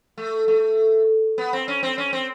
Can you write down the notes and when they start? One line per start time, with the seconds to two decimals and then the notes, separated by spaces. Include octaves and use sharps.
0.18 A3
0.48 A3
1.38 B3
1.53 C4
1.68 C#4
1.83 C4
1.98 C#4
2.13 C4